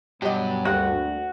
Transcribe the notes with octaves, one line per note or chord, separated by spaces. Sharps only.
G2 B2 F#3 G4 D#5
D2 G3 A#3 C4 F#4 F#5